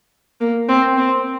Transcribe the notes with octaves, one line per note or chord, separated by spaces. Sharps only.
A#3
C4
C4